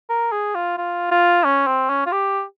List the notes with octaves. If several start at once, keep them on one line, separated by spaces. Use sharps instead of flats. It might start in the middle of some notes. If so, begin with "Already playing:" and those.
A#4
G#4
F4
F4
F4
C#4
C4
C#4
F4
G4